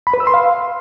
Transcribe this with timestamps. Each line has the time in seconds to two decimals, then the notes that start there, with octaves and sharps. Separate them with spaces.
0.07 B5
0.14 B4
0.20 E6
0.27 C6
0.34 F5